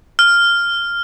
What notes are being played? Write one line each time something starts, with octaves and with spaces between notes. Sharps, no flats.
F6